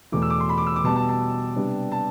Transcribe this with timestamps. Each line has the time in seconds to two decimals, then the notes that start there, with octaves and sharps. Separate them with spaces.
0.12 E2 B2 A3 D6
0.22 E6
0.30 D6
0.40 C6
0.49 B5
0.58 D6
0.67 E6
0.76 D6
0.84 B2 G3 B3 A5
0.96 A5
1.09 A5
1.56 C3 G3 B3 D4
1.92 A5